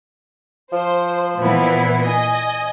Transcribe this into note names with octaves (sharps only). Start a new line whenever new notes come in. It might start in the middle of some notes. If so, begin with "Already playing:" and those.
F3 C5
A#2 E3 B3 E4
D#5 G#5